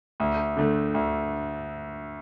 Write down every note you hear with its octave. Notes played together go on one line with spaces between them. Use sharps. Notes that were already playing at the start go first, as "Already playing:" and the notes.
D2
D3 A3
D2